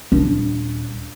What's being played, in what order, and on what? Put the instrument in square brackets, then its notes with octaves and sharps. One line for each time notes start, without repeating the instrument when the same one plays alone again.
[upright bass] D#1 D4